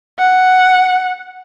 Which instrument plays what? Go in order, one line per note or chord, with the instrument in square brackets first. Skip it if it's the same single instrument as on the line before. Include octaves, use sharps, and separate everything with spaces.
[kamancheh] F#5